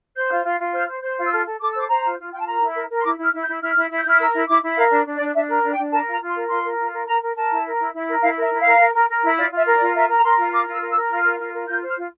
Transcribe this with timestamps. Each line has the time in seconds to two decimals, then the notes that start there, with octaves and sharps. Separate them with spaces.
0.16 C5 G6
0.31 F4
0.45 F4
0.59 F4
0.73 C5 F6
0.88 C5
1.02 C5 G6
1.17 F4
1.25 E6
1.31 A4 F6
1.46 A4
1.60 A4 D6
1.70 E6
1.74 C5 D6
1.89 C5 A#5
2.03 F4
2.18 F4
2.32 F4 G5
2.39 A5
2.46 A#4 A#5
2.61 E4
2.75 A#4
2.89 A#4
2.98 C6
3.04 E4 D6
3.18 E4 F6
3.33 E4
3.42 G6
3.47 E4
3.62 E4 F6
3.76 E4
3.90 E4
3.98 G6
4.05 E4 F6
4.19 A#4 E6
4.34 E4
4.47 E4 D6
4.63 E4
4.77 A#4 F5
4.91 D4
5.06 D4
5.16 D5
5.20 D4
5.34 D4 E5
5.48 A#4
5.64 D4
5.73 G5
5.78 D4
5.92 A#4 A5
6.06 F4
6.11 A#5
6.20 F4
6.30 C6
6.35 A#4
6.49 F4 C6
6.64 A#4
6.78 F4
6.93 A#4
7.07 A#4 A#5
7.22 A#4
7.36 A#4 A5
7.50 E4
7.65 A#4
7.79 E4
7.94 E4
8.08 A#4
8.22 E4 F5
8.37 A#4 E5
8.50 E4
8.60 A#4 F5
8.79 A#4
8.94 A#4
9.08 A#4
9.22 E4
9.37 F4 D5
9.52 F4 E5
9.66 A#4
9.75 D5
9.81 F4
9.95 A#4 E5
10.09 A#4
10.17 A#5
10.23 A#4 C6
10.38 F4
10.52 A#4 D6
10.67 F4 E6
10.81 A#4
10.91 E6
10.96 A#4
11.10 F4 F6
11.24 A#4
11.39 F4
11.53 A#4
11.68 F4 G6
11.82 C5 F6
11.97 F4